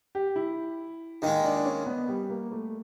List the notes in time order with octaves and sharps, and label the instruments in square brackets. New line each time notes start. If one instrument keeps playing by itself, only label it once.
[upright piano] G4
E4
[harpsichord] D#2 D#3 G#3 [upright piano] D#4
[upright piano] D4
D4
C#4
B3
G3
A#3
A3